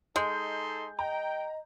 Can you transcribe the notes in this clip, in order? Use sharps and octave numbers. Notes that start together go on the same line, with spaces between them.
G#3 D#4 A4 C6 G6
D#5 G5 A#5